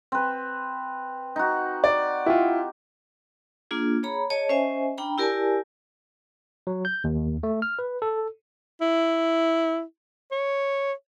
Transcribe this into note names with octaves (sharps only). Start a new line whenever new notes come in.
C4 B4
D#4 F#4
D5
E4 F4 G4
A#3 D4 F4 G#4
G#4 C#5 A#5 B5
G#4 C#5 D#5 A5
C#4 C5 D#5 E5 G#5
D4 G5 A#5 B5
E4 G4 A#4 D5 G#5 A5
F#3
G6
D#2
A3
F6
B4
A4
E4
C#5